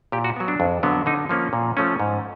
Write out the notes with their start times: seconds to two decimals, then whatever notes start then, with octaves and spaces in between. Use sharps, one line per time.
0.12 A#2 G4
0.24 F#4
0.36 F#3 B3
0.48 D4
0.60 F2
0.83 D3 F#3 B3
1.06 D3 D#4
1.29 F3 A#3 C#4
1.53 A#2
1.77 F3 A3 C#4
2.00 G#2